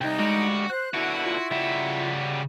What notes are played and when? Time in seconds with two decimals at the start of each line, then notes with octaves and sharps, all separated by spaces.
0.01 C2 D#4 G5
0.19 D2 G3 G#3 F#4
0.70 C5 F#6
0.94 B2 D3 E4 F#4
1.26 F4
1.51 C#3 G3 F#4 E5